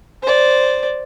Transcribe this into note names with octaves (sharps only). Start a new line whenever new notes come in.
C5 D5